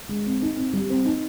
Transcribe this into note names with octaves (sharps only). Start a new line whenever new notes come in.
G#3
C4
D#4
C4
G3
C4
D#4